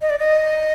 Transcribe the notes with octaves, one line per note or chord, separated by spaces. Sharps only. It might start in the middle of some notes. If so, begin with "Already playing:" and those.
D#5
D5
D#5